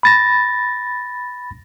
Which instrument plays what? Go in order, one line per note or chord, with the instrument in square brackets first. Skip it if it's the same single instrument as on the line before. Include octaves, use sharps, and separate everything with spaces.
[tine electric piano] B5 A6 A#6